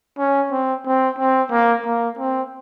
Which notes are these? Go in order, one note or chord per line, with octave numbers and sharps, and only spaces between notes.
C#4
C4
C4
C4
A#3
A#3
C4